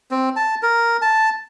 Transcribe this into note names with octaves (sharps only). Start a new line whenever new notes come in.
C4
A5
A#4
A5